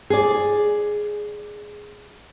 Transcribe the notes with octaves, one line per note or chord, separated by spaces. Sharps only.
G#4 D5